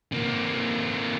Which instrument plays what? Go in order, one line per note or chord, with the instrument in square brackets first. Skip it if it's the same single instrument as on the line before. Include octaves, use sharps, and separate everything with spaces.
[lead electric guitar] C3 A#3